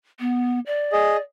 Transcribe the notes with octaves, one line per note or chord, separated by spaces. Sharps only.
B3
D5
G#4 D#5